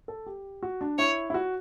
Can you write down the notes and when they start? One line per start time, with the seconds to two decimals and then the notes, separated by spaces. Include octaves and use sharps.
0.08 A4
0.26 G4
0.63 F#4
0.81 D4
0.98 E4 C#5
1.30 E4
1.34 F#4